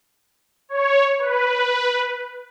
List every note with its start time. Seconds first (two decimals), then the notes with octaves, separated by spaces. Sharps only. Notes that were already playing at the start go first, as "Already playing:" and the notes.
0.69 C#5
1.19 B4